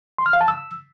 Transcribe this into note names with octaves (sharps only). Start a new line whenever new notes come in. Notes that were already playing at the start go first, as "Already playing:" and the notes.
C6
F6
F5
A5
E6